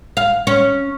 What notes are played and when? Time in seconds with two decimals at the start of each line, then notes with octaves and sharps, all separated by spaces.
0.17 F5
0.47 C#4